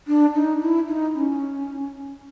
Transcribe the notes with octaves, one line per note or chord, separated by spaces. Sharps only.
D4
D#4
E4
D#4
C#4